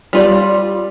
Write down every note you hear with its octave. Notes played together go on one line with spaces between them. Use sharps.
G3 F4 D5